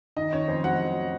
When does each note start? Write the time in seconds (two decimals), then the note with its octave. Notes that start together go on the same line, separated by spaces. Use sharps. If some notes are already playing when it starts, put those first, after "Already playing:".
0.17 D#3 D#5
0.33 C#4 C#5
0.48 F2 C5
0.64 F#3 F#5